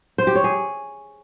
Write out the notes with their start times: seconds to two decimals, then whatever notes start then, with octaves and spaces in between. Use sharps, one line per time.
0.18 C5
0.27 G4
0.36 C#5
0.44 G#4